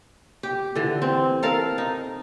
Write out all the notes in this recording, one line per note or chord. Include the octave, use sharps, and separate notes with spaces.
G4
D3 E3
C4
A4 A#4 F5
D#4